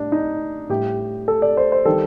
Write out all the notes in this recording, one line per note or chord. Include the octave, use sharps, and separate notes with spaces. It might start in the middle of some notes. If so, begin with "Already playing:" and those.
Already playing: A2 G3 D4
D#4
A2 G3 G4
A4
D5
C5
C5
D#3 G3 A4